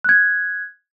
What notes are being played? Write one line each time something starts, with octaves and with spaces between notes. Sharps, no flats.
F#6 G#6